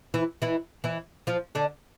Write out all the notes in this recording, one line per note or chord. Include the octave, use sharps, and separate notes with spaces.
E3 E4
E3 E4
E3 E4
F3 F4
D3 D4